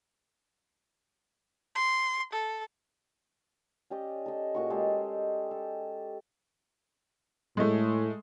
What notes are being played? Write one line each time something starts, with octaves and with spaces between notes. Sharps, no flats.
C6
A4
C#4 G4 D5 D#5
A4 D#5
A#2 F#4 C#6
G#3 G4 A4
A4
A2 G#3 A3